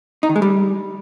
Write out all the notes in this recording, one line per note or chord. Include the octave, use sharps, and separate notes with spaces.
D#4
D#3
G#3
G3